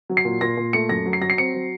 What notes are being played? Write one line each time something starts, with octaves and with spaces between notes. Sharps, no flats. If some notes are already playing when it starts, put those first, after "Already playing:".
F#3
C7
A#2
A#2 A#6
A#2
A3 C#7
F#2 A#6
F#3
C7
F#3 A#6
C7
C4 C#7
F#3